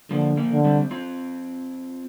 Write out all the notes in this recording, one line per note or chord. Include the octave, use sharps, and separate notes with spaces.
D3 F3 A#3
F3 A#3
D3
G3 C4
C4 F4